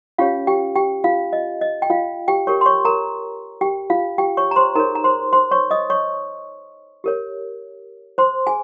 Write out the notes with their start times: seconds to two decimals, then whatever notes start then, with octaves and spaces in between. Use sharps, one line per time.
0.18 C#4 F4 G4 C#5 F5
0.47 G4 G5
0.75 G4 G5
1.04 F4 F5
1.33 D#5
1.61 D#5
1.82 G5
1.90 F4 F5
2.28 G4 G5
2.47 G4 A#4 C#5 C#6
2.61 C6
2.66 C#5 C#6
2.85 A#4 A#5
3.61 G4 G5
3.90 F4 F5
4.18 G4 G5
4.37 C#5 C#6
4.51 A#5
4.56 C5 C6
4.75 D#4 G#4 A#4 C#5 A#5
4.95 A#5
5.04 C5 C6
5.33 C5 C6
5.51 C#5 C#6
5.71 D#5 D#6
5.90 C#5 C#6
7.04 G4 A#4 C#5
8.18 C5 C6
8.47 G#4 G#5